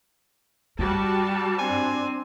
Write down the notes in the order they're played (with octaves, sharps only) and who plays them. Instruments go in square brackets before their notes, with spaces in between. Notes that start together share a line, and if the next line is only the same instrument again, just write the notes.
[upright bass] G2 [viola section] G3 F#4 A5
[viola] C4 D4 [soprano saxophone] G#5